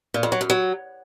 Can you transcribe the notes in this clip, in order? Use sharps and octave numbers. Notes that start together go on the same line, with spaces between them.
A#2
F2
F#3
F#2
F#3